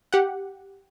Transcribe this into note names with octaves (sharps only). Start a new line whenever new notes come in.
G4 F#5